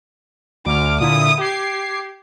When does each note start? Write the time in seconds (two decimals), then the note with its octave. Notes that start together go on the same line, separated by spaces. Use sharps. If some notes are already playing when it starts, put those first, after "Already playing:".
0.66 D2 D6 F6
1.00 A#2 D3 E4 D#6
1.40 G4 D6 G#6 C7